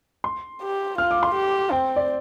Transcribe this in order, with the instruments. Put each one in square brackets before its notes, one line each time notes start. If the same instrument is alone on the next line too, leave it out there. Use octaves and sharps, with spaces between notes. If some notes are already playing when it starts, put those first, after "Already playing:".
[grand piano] C6
[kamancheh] G4
[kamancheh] F4 [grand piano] F6
[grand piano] D6
C6
[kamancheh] G4
[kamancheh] C4 [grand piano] G5
[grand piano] D5